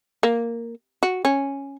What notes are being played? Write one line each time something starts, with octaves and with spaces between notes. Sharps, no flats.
A#3
F#4
C#4